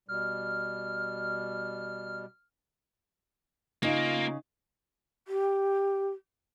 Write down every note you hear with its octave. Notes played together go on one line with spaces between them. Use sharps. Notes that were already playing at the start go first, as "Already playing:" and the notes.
B2 G3 F6
C#3 A#3 D#4 F4
G4